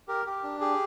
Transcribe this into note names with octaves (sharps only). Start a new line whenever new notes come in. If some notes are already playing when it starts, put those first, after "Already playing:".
G4 A#4
G4
D4
G4 G#4